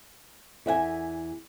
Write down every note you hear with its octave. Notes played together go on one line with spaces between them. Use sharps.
E2 E5 F#5 G#5